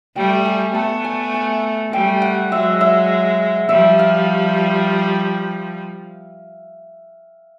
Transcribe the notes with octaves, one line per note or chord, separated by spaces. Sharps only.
G3 A3 G5
G#5
A3 B3 A5
G#5
G#5
G3 A3 G5
F#5
F#3 G#3 E5
E5
F3 G3 E5
F5